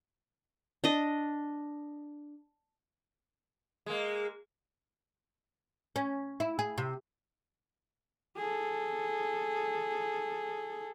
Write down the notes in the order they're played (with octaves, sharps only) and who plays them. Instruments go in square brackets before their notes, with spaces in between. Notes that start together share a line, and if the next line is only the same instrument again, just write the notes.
[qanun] D4 D#5
[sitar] G#3 A#3
[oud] C#4
E4
G#4
C3
[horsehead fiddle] G#4 A4